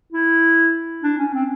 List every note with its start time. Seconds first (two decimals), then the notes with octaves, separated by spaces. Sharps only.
0.13 E4
1.04 D4
1.19 C#4
1.34 C4